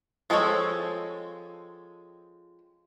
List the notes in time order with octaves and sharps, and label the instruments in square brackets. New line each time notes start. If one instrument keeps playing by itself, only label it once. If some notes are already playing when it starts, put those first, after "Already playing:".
[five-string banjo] F3 G#3 C4 A4 C#5